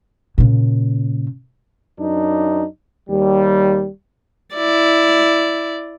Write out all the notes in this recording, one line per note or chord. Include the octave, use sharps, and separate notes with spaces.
A#2 C#3
F#2 D4 D#4
D#2 G3
E4 D5